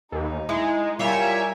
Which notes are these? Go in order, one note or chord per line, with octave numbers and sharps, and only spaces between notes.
D#2 D#4
G#3 E4
G3 F4 A#4 C#5 E5 G#5